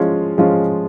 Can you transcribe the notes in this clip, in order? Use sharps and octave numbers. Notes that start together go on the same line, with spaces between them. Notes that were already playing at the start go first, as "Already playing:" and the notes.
Already playing: F3 G#3 C#4 F4
F3 G#3 C#4 F4